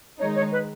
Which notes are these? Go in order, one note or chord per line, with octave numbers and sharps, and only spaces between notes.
D#3 G#3 D#4 C#5
C#5
B4